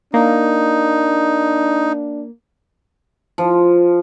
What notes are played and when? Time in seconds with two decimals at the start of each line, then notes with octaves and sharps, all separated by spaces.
0.14 A#3 D4 D#4
3.38 F3